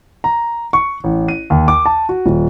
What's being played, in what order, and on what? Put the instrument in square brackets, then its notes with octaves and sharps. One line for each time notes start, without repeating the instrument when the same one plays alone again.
[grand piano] A#5
C#6
A1
D#7
D#2
D6
A5
F#4
D#1